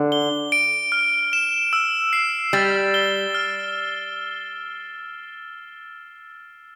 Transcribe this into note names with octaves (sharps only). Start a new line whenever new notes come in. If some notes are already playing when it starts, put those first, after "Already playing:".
Already playing: D3
G7
D7
F6
E7
E6
C7
G3 A6
G7
F6